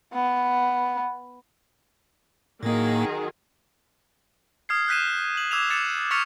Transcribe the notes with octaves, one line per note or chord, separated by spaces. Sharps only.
B3
A2 D#3 F#3 A#3 G#4
D#6 F6 G#6 C7
F#6 G6 B6 D#7 E7
F#7
D6 E6 G#6 E7 F7
D6 A6 C#7 E7
C#6 F6 A6 B6 C#7 F7